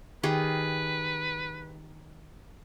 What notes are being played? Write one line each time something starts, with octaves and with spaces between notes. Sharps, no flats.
D#3 G4 G#4 B4